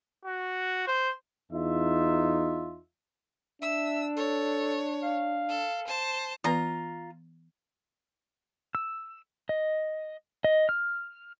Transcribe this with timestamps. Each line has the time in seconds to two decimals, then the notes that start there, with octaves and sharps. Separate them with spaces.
0.25 F#4
0.88 C5
1.52 E2 D#4 F4 E5
3.62 D4 E5 E6
4.17 A4 C#5
5.03 F5
5.50 A4
5.87 C5 A5
6.44 E3 B3 F4 B4 A#5
8.75 E6
9.49 D#5
10.44 D#5
10.69 F6